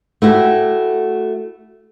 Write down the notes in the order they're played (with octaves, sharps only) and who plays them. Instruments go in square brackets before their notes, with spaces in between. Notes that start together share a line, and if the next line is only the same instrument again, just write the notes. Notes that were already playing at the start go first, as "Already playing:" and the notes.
[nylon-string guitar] A3 E4 F#4 G4